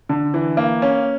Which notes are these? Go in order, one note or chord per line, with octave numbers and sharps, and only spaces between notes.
D3
E3
A#3
C#4